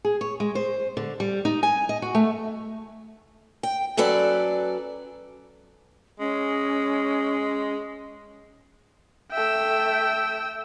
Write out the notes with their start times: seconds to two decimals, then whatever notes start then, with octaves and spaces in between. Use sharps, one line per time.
0.05 G#4
0.21 C#5
0.40 G#3
0.55 C5
0.97 D3
1.20 G3
1.45 D#4
1.63 G#5
1.89 D#5
2.02 F#4
2.15 A3
3.63 G5
3.97 F#3 C#4 A4 B4 D5
6.20 G#3 C#4
9.32 A3 E5 G5 E6